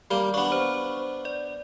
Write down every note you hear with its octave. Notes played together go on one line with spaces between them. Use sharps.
G3 A#3 G5
B3 D4 C#6
C5
D5